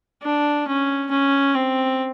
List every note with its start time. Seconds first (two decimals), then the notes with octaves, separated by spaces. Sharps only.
0.22 D4
0.67 C#4
1.10 C#4
1.55 C4